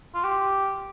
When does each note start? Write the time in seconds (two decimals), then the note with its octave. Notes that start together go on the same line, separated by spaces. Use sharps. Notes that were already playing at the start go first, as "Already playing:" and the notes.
0.15 F4
0.24 G4